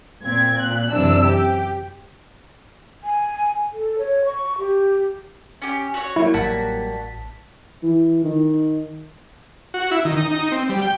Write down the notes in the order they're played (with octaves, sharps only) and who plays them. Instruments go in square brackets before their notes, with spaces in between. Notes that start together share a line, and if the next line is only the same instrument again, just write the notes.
[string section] A#2 C4 G#6
A#2 F#6
F#2 C3 E3 D4 E6
G4
[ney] G#5
A4
C#5
C#6
G4
[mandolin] C#4 G4
F#4 C#5
[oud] F#3 G3 A#3 [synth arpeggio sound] E4
[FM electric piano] A1 A5 B6 [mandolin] F#4
[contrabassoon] E3
D#3
[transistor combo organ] F#4
E4
D#3
D#4
D#4
C4
G3
G5